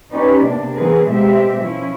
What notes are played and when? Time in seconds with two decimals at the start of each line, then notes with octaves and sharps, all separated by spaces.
0.12 C#4 D#4 G4 B4 D5
0.45 C3 A#3 B3 D4
0.75 E3 B3 C4 G#4 A#4 B4
1.11 B2 G#3 A#3 C4 G4 E5
1.64 F3 C#4 E4